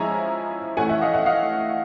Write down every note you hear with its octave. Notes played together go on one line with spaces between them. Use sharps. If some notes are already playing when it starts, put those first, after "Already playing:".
Already playing: F3 G#3 C#4 E4 G#5 A#5
E3 A3 C#4 F#5 G#5
E5 F#5
D#5 F5
E5 F#5
D#5 F5